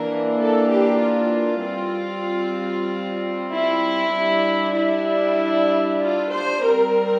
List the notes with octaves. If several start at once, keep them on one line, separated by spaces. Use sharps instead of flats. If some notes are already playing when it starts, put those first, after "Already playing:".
Already playing: E3 A#3 D4 A#4
A4
G4
F4
G3 C4
E4
G3 D4
E4
F4
C5
G3 C4 A#4